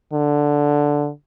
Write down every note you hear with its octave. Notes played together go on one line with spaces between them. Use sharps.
D3